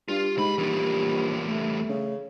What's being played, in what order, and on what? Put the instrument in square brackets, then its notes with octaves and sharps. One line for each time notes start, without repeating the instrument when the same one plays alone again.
[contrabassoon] G2 [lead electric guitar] F4 [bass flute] G4
[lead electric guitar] C#2 B5 [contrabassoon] G#2
[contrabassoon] A#1 [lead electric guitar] E2 G3
[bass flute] A3
[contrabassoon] C#3